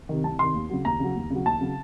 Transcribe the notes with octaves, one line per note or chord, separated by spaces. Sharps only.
C3 D#3
C2 A5
C3 D#3 C6
D#2
C#3 F#3
D#2 A#5
C#3 F#3
D#2
C#3 F#3
D#2 A5
C#3 F#3